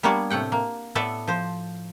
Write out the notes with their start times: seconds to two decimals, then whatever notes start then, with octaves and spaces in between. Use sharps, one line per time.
0.03 G3 A#3 B3 D4 C#5 D5
0.30 A2 C3 A3 F#5 G5
0.52 A#3
0.95 A2 B3 A4 B4 D5 E5
1.27 F3 C5